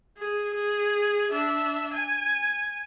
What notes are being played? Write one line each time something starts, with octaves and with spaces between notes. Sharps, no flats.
G#4
G#4
D4 E5
G#5